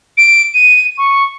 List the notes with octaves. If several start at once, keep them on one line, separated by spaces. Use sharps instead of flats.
D7
D#7
C#6